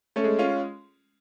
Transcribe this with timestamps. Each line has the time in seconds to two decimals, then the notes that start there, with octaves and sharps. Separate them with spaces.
0.16 A3 C#4
0.24 G#3
0.39 C#4 F4